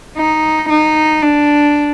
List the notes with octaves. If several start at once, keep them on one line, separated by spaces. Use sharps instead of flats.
D#4
D#4
D4